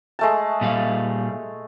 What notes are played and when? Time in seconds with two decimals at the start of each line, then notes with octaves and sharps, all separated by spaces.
0.19 G#3 A3 A5
0.61 A#2 G3 F5